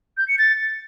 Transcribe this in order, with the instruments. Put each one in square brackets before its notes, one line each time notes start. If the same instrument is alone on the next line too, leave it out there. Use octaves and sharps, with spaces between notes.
[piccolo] G6
C#7
A6